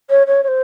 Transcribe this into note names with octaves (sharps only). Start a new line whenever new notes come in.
C#5
C#5
C#5
C5